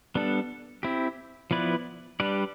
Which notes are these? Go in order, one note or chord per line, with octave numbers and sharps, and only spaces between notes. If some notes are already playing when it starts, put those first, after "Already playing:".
G3 B3 D4 A4
C4 E4 G4
F3 B3 E4 B4 D5
G3 D4 G4 B4 D5